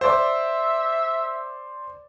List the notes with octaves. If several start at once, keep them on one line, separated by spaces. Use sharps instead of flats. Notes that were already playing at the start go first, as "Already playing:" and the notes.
C5 D5 E5 D6